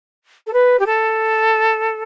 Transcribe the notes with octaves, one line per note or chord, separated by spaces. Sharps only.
A4
B4
G4
A4